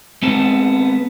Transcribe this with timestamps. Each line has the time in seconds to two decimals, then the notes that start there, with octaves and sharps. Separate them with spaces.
0.22 G#3 B3 C4 A5